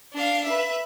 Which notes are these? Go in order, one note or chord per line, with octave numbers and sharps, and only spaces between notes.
D4 F5
B4 E5